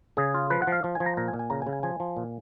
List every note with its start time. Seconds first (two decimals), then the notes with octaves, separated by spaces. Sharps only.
0.17 C#3 G#4
0.34 F4
0.50 F3 B4
0.62 F#5
0.67 F3
0.72 F5
0.84 F3
0.95 G#5
1.00 F3
1.06 A#5
1.17 A#2 A#5
1.28 G#5
1.33 A#2
1.39 G#5
1.50 C#3 A#5
1.62 G#5
1.67 C#3
1.73 G#5
1.83 F3 G#5
2.00 F3
2.17 A#2